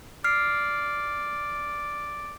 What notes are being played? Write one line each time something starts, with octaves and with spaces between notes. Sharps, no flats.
D5 F6 C7